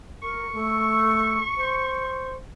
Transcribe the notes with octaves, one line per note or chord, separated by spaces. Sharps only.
A#4 C#6
A3
C5